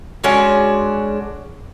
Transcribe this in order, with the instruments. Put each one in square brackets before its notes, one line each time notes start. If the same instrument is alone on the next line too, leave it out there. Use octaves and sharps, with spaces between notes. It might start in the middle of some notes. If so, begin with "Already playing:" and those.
[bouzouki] G#3 C#4 D4 F#4